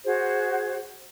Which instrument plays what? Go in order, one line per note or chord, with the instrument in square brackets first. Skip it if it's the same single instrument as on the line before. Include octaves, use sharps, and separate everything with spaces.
[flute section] F#4 G#4 C5